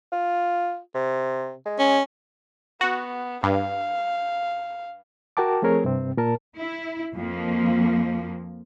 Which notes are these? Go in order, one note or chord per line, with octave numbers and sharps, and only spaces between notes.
F4
C3
G#3
C#4
B3 F#4
G2 F5
F#4 A#4 G5 A5 D6
F3 A3 C4 G#4 A#4 C#5
G2 C3 C4
A#2 A#4 A5
E4
F2 F3 A#3